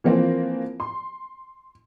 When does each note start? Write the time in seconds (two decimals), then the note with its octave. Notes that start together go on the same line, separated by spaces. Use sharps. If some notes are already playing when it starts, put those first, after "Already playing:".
0.04 E3 F3 A#3 C4
0.80 C6